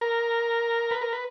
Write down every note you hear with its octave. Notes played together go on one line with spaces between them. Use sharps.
A#4
B4
A#4
B4